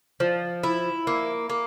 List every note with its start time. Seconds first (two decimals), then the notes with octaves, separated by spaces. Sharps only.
0.20 F3
0.63 E4
1.07 A#3
1.50 A#3